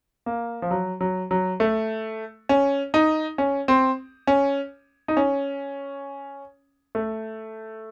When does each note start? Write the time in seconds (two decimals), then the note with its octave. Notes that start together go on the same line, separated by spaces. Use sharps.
0.26 A#3
0.62 F3
0.71 F#3
1.01 F#3
1.31 F#3
1.60 A3
2.49 C#4
2.94 D#4
3.38 C#4
3.68 C4
4.27 C#4
5.08 D#4
5.17 C#4
6.95 A3